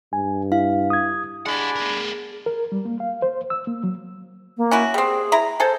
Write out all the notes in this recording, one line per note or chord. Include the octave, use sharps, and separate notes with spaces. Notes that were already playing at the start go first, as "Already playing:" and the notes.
G2 G#5
E4 F5
D#6 G#6
G#3 D4 G4 F#5 G#5 B5
B3 A#4
A#4
G3
A#3
F5
C5
E6
A#3
F#3
A#3
C#4 E4 F#4
G3 C4 G#4
E4 A#5
G#4 A4 C5